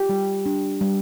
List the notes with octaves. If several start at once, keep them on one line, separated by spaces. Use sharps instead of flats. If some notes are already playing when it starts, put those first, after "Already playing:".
Already playing: F4 G4
G3
D4
G3